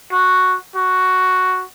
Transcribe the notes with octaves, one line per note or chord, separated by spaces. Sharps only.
F#4
F#4